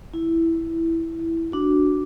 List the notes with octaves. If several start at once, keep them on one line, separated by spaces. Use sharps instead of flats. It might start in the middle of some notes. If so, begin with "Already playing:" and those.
E4
D4 F#4